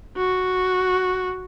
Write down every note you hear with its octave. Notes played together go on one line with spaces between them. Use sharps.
F#4